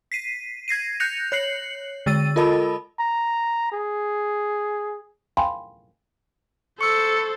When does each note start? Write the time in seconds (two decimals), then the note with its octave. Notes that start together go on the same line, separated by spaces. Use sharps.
0.12 B6 C7 D#7
0.68 G#6 A#6 C7 D#7
1.00 F#6 G6 A#6 C#7 F7
1.32 C#5 F#6 C7 C#7 F#7
2.06 D3 G#3 E6 A6 D#7
2.36 F4 A4 A#4 D#5 A5 B5
2.99 A#5
3.72 G#4
5.37 F5 G5 G#5 B5 C6
6.81 A4 C5 C#6 E6 C#7